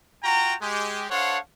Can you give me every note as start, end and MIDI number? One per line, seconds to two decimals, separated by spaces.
0.23 0.54 65
0.23 0.54 66
0.23 0.54 79
0.23 0.54 82
0.61 1.05 56
0.61 1.05 67
1.10 1.37 62
1.10 1.37 69
1.10 1.37 72
1.10 1.37 73
1.10 1.37 77
1.10 1.37 78